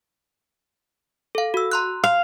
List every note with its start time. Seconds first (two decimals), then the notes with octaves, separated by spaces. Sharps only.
1.35 A4 F5
1.54 F#4 E6
1.72 A#5 C6 F#6
2.04 F5